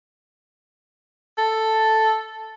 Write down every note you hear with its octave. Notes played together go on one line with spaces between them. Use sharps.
A4